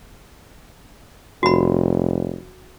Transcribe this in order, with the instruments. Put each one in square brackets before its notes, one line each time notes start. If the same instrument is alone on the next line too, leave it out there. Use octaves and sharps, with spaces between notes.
[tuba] F1 [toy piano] F#4 B5